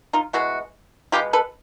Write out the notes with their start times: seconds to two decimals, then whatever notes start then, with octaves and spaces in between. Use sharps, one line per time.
0.13 D#4 F4
0.33 B2 G#3 B3 E4 F#4
1.12 B2 G#3 B3 F4 G4
1.33 A4 B4